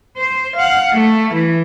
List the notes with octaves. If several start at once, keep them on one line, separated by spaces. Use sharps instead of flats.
C5
F5 F#5
A3
E3